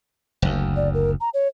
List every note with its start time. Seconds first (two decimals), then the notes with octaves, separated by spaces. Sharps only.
0.42 F#1 D2
0.76 D5
0.94 A#4
1.21 A#5
1.34 C#5